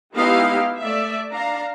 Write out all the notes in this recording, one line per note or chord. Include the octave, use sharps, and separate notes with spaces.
G#3 B3 D#4 E4 G4 F5
A3 D5 E5
D4 F5 A#5